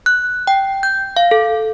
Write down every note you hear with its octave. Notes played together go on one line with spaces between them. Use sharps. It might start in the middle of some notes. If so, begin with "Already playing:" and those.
F#6
G5
G6
F5
A4